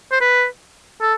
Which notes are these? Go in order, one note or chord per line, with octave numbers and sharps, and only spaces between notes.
C5
B4
A4